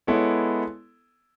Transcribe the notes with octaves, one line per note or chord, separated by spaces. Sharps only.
G#3 B3 E4 A4 C#5